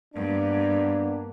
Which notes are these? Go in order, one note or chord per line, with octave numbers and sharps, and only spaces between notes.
G2 A#3 B3 D4